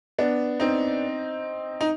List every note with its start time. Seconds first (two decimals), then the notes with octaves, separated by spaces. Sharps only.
0.18 B3 D4
0.60 C4 D#4
1.81 D#4